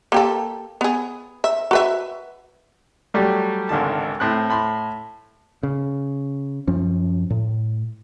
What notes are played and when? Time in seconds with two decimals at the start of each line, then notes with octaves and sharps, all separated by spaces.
0.12 A#3 G4 A4
0.81 B3 G#4
1.44 E5
1.71 F#4 B4 E5
3.14 F#3 G3 A3 G4
3.69 G#1 C#2 D3 D#3 A5
4.20 A2 C4 F#6
4.49 A2 B5 C6
5.63 C#3
6.67 F#2 F3 C#4
7.30 A2